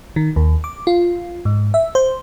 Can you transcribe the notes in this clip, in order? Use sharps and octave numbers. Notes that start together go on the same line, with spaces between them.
D#3
D#2
D6
F4
G#2
E5
C5